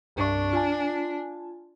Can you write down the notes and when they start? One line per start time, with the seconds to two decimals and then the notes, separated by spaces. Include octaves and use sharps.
0.16 C2 G2 D4 C#6
0.53 F4 G#5 A5